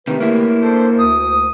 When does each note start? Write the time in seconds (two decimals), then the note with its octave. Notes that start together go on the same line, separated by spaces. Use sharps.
0.08 C3 D#3 A3 G4 B4
0.20 A#3 E4
0.62 D4 A4 C5
0.99 D2 D#6